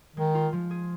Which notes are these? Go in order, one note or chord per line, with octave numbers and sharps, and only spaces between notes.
D#3 G#3
F4
F3
G#4